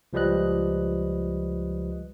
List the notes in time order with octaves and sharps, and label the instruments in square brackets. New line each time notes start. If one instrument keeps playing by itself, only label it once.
[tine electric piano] C#2 F3 G3 B4 D#5 F#6